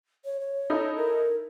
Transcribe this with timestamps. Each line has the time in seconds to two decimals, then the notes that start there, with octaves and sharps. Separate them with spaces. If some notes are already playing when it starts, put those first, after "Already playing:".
0.25 C#5
0.40 C#5
0.70 D#4 E4 A4
0.97 A#4